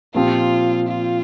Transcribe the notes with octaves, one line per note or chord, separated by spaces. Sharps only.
A#2 F3 C4 F4 G4
F4